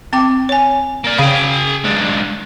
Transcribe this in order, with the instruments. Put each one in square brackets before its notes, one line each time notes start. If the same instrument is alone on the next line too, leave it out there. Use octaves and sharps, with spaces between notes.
[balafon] C4 G5 D6
C#5 G#5
[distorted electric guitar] A#3 D5
[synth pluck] C#3 B5 [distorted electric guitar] G#4 G5 [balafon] F5
[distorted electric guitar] G#2 D4